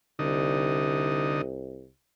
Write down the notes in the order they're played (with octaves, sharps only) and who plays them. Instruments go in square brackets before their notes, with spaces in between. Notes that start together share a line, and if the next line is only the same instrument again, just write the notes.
[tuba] C2 [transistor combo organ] D3 D#4